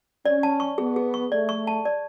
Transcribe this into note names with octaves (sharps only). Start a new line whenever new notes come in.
C#4 D5
A5
C#6
B3 G#4
G#4
C#6
A3 D5
C#6
A5
D5